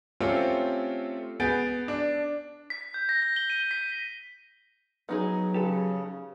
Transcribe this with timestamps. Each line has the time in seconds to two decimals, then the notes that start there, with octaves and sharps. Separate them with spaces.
0.20 A3 C4 C#4 F4 G4 A4
1.40 B3 G#4 G6 A6 D7
1.88 D4
2.70 B6
2.94 G6
3.09 A#6
3.22 A#6
3.36 G7
3.50 D#7
3.71 B6
5.09 F#3 B3 D#4 G#4
5.54 C#3 G4 A4 B4